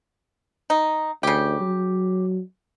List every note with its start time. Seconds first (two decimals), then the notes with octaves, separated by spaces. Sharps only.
0.70 D#4
1.23 D2 C#3 G4
1.61 F#3